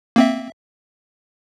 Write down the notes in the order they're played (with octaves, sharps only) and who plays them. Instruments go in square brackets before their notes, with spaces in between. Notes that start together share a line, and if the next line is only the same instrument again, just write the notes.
[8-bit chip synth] A#3 C4 E5